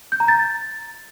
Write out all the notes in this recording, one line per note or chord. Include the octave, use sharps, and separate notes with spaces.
G6
A#5
A6